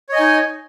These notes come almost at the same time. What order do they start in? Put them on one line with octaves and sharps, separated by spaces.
C#5 D#5 G#5 D#4